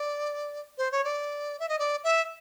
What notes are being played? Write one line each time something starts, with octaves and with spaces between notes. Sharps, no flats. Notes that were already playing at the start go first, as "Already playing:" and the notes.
Already playing: D5
C5
C#5
D5
E5
D#5
D5
E5